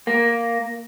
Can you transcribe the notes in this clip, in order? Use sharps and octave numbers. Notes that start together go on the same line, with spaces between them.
A#3